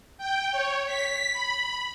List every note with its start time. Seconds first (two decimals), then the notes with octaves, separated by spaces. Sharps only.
0.18 G5
0.52 C#5
0.86 B6
1.33 B5